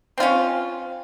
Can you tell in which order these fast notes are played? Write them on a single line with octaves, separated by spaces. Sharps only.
C4 F4 C#4